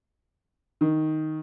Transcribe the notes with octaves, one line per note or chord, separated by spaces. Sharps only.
D#3